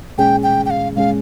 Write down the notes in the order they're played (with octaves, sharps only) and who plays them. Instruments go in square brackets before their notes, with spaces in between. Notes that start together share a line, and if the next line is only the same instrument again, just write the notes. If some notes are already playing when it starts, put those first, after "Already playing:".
[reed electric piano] A#2 G#3 C#4 G#4 [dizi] G5
[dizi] G5
G5
F5
[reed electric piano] A#2 G#3 C#4 G#4 [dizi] F5